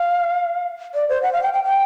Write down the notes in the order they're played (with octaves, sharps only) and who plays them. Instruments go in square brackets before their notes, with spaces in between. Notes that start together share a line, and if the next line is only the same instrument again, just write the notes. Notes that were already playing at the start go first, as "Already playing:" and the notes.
Already playing: [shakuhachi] F5
D5
C5
F#5
F5
G5
G5
G5